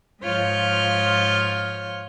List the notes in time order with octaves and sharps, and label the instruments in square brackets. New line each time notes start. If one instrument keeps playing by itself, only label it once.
[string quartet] G#2 F3 F4 C#5 F6 G6